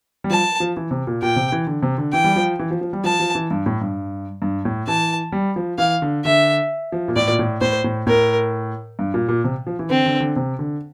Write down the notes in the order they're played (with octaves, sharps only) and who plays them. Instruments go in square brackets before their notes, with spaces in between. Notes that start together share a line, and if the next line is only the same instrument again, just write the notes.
[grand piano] G3
[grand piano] F3 [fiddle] A5
[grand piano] F3
E3
C3
A#2
[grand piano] A#2 [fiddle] G5
[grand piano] C3
E3
D3
C3
D3
[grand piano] E3 [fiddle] G5
[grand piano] G3
F3
E3
F3
F3
G3
[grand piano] F3 [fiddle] A5
[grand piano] F3
E3
G2
A2
G2
G2
A2
[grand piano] E3 [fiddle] A5
[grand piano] G3
F3
[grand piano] E3 [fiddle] F5
[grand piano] D3
[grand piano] D3 [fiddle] E5
[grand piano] F3
A#2
[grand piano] A2 [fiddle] D5
[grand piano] A#2
A2
[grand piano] A2 [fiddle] C5
[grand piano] A2
[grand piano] A2 [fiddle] A#4
[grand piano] G2
A#2
A#2
C3
F3
E3
[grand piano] D3 [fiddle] C4
[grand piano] D3
D3
C3
D3